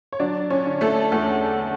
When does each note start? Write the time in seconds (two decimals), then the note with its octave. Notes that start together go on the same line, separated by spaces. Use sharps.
0.13 C#5
0.20 F#3 D4 D5
0.50 C#4 C#5
0.66 D3
0.81 A3 A4
1.12 E2 A3 A4